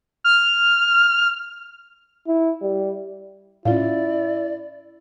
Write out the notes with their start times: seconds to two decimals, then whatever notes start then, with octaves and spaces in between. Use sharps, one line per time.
0.24 F6
2.27 E4
2.62 G3
3.65 A2 C#4 E4 F4 D5 F5